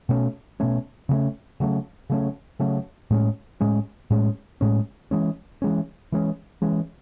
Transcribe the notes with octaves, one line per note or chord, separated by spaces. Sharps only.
B2 A3 C#4
B2 A3 C#4
C#3 F#3 A3 C#4
C#3 F#3 A3 C#4
C#3 F#3 A3 C#4
C#3 F#3 A3 C#4
A2 G#3 C#4
A2 G#3 C#4
A2 G#3 C#4
A2 G#3 C#4
E3 G#3 C#4
E3 G#3 C#4
E3 G#3 C#4
E3 G#3 C#4